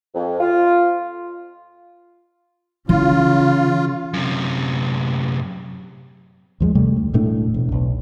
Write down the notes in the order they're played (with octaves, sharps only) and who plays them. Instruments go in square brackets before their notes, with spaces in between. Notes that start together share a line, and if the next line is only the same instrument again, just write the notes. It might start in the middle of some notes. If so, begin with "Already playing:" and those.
[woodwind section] F2
F4
[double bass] C#3 [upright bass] E3 [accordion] F4
[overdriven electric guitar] F#2 C3
[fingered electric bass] D#2 F3 G#3
F2 C3 G3 A3
D2
E1 A2 A3 D4
E1
B1